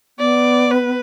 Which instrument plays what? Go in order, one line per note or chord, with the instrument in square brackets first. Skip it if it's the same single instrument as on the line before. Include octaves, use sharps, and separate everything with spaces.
[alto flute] B3 [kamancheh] D5
[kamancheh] B4